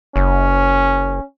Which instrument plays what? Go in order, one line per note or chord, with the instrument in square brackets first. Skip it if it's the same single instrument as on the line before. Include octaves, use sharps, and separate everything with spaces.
[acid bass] F#1 [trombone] C#4